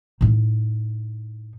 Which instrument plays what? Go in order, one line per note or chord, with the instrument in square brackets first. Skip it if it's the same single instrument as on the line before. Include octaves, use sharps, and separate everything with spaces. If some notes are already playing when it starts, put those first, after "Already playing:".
[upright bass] A2 D#4